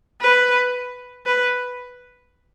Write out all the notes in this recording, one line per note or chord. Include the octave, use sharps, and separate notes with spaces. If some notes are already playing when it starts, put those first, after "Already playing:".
B4
B4